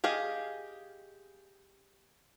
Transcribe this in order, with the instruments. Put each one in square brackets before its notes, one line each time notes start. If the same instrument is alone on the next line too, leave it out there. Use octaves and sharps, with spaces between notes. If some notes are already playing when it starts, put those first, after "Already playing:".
[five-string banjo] G4 G#4 D#5 F5